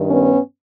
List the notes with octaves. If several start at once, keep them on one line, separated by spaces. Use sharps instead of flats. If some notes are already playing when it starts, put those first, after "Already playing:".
Already playing: G2 D#3
B3 C#4